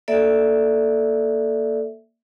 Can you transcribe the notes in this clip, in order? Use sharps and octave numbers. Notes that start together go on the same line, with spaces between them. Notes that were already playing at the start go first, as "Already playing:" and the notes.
A#3 A4 D5 E5